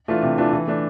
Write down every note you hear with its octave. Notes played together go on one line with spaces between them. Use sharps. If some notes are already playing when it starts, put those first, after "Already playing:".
E3 A3 D4 F4
C3
E3 A3 D4 F4
E3
A3 D4